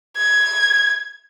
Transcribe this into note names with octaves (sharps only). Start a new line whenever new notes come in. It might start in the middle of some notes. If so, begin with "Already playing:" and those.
G#6